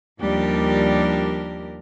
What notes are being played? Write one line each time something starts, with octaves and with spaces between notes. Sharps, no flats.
D#2 F3 G3 D4 G4 A#4